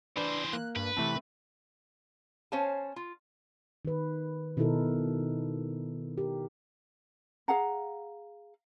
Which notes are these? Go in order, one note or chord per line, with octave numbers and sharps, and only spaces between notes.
E3 D4 B4 C5 D5
A#3 F#6
G2 B4
C3 E3 A3 C4 A5
C#4 C5 C#5 F5 G#5 A5
F4
D#3 B4
B2 D#3 D#4 E4 A4 A#4
G4 A#4
G#4 F5 F#5 A#5